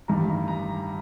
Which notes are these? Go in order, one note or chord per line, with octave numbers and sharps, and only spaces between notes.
A1 G2 D#3 A#5
A#5